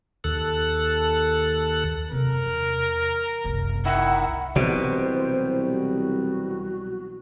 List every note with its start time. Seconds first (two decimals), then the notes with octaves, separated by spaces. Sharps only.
0.24 D#2 A4 F#6
2.11 F#2 C3 A#4
2.46 E2
3.44 F#1 C2
3.85 D#3 E4 F#5
4.56 C2 B2 E3 F#3 G3 C5
5.72 F#4